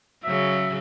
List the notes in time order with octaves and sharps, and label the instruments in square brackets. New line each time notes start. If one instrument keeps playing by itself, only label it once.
[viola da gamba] C#3 F#3 [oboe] E5